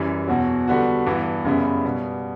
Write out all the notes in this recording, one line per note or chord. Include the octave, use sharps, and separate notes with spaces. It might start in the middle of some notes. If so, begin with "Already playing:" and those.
Already playing: F#2 E3 G3
E2 B2 F#3
D3 G3 B3 F#4
G2 E3 B3
F#2 C#3 G3 B3 E4
B2 G3 B3